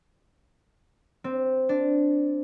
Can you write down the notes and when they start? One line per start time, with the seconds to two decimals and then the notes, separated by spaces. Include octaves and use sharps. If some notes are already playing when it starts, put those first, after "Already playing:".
1.24 C4
1.69 D4